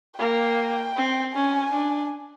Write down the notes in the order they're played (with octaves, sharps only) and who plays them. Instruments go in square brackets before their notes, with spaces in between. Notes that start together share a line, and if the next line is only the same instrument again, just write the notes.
[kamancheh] A#3 [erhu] G5
[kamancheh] C4
[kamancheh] C#4 [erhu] G#5
[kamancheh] D4